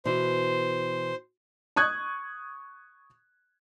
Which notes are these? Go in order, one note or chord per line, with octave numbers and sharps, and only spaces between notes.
B2 E3 C5
C#6 D#6 F#6 G#6